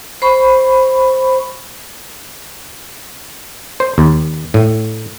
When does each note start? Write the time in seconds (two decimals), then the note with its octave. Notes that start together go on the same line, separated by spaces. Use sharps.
0.22 C5 B5 C#6
3.80 C5
3.98 D#2
4.54 A2